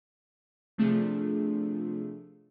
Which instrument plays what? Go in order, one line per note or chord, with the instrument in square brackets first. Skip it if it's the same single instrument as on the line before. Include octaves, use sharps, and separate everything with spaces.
[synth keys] C3 F3 A3 D4 F4 G#4